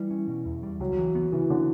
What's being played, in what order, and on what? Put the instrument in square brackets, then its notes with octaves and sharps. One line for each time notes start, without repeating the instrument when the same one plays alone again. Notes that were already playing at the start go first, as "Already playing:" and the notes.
Already playing: [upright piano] E3 [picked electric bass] G3
[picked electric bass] C#4
B2
E2
G3
[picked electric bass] C#2 [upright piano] F#3
[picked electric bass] E3
B3
[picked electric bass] C#3 [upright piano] E3
[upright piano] D3